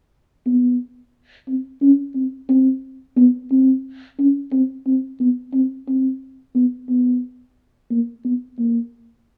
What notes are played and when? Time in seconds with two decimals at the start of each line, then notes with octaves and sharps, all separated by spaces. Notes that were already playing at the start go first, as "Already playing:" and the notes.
0.46 B3
1.48 C4
1.82 C#4
2.15 C4
2.49 C4
3.17 B3
3.51 C4
4.19 C#4
4.52 C4
4.87 C4
5.20 B3
5.53 C4
5.88 C4
6.55 B3
6.89 B3
7.91 A#3
8.25 B3
8.59 A#3